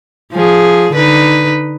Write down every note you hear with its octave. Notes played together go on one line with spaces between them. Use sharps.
F3 G#4
D3 D#4 B4